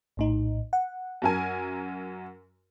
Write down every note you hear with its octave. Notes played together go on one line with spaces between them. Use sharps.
A#1 A2 D#4
F#5
F#2 A#4 G#5